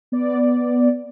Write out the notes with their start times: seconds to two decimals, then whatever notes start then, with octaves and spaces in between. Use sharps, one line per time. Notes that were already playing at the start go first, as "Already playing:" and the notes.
0.12 B3 D5